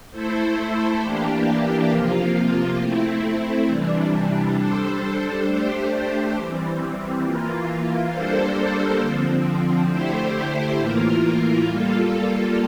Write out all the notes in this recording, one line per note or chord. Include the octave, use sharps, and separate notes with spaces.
A3 E4 A4 C5
E3 A#3 D4 G4
C3 F3 A#3 F4
A3 C4 E4
C3 E3 G3 D4
G3 D4 A4 C5
A3 D4 G4 C5
E3 G3 C4
E3 A#3 F4
G3 A#3 D4 A4 C5
D3 F3 C4
D3 A3 E4 G4 C5
A2 E3 A#3 F4 A#4
G3 A#3 F4 A4